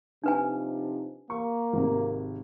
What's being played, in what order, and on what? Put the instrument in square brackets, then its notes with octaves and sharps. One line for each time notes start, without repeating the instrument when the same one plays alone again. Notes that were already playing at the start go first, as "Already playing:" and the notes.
[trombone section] C3 F3 D#4 [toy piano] D4 B4 G#5
[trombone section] A#3 [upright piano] C#6
[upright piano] G#1 C3